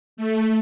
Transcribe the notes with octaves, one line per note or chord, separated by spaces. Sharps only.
A3